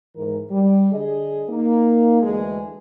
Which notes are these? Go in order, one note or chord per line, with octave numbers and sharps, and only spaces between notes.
G#2 E3 A#4
G3
D3 G#4 D#5
A#3 D#4
D2 E3 G#3 G#4